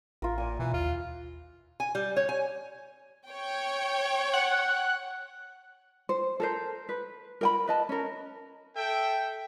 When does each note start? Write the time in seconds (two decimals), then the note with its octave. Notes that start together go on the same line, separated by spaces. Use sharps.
0.22 A1 F4 A#4
0.38 A#2 G#5
0.59 B2 E3
0.74 D#2 F4
1.80 G#5
1.95 G3
2.17 C#5
2.29 G#5
3.28 C#5 G5
4.34 F#5
6.09 C5
6.40 A4 A#4 C5
6.89 B4
7.41 A#4 G5 B5
7.67 B4 D#5 A5
7.89 C#4 A#4
8.76 A4 E5 G5